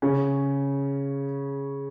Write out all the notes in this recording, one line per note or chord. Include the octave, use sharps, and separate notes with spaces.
C#3 C#4